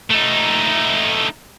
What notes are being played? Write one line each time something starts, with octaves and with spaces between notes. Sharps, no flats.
A3 D#4